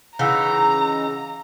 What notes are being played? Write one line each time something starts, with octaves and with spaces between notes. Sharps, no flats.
C#3 E3 D#4 F5 F#5 A#5 E6